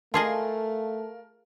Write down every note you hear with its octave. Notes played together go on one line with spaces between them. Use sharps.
A3 F4 G#4 A#4 D#5 F5 A5